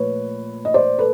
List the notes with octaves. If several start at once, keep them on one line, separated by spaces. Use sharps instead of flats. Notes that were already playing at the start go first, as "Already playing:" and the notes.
Already playing: A#2 F3 A3 B4 C#5
D#5
C5 D5
A4 B4